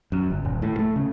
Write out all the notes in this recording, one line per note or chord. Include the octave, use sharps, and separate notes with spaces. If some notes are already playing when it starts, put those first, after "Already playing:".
F#2
G1
D#1
A2
A3
C#3